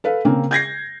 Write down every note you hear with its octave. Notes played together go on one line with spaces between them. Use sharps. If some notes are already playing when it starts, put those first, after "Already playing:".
A4 B4 F5
C#3 A#3 C4
G6 G#6 A#6 C7